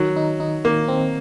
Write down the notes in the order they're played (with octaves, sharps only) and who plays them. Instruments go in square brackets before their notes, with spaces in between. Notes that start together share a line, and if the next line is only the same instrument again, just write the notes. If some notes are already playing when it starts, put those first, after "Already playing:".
Already playing: [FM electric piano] D#3 [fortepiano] F#3
[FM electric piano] D#4
D#4
[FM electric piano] D#3 [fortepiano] A#3
[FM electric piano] C4